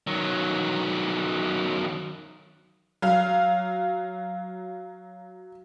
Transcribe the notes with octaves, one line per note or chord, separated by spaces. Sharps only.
D#3 F#3
F#3 F5